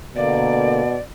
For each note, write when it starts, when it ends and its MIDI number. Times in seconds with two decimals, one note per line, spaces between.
0.16 0.96 47
0.16 0.82 50
0.16 0.82 58
0.16 0.99 74